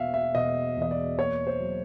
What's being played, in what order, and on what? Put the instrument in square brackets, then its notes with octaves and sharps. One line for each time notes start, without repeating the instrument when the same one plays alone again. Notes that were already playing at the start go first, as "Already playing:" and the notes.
Already playing: [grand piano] E1 B2 E5 F5
E5
E1 D#5
E2 D#5
D5
A#3 C#5
C5
F#3